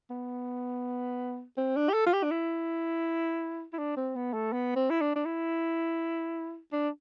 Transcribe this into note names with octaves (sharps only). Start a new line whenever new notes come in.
B3
C4
D4
G4
A4
F4
G4
D4
E4
E4
D4
C4
B3
A3
B3
C4
E4
D4
D4
E4
D4